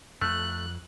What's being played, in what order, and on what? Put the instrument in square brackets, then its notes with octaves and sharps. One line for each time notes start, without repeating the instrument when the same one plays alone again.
[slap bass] F2 [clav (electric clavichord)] A3 [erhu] F#6